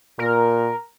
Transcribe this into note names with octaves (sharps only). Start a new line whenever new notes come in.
A#2 A#4